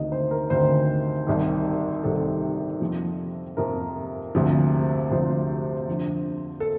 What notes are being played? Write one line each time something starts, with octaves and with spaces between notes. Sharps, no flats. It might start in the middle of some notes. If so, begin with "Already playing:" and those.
Already playing: D2 C3 D#3 D#5
C5
A#4
D2 C3 D#3 C5
C2 C3 D#3
C2 C3 D#3 A4
F2 C3 F3
F2 C3 F3 A#4
D2 C3 F3
D2 C3 F3 C5
F2 D3 F3
A4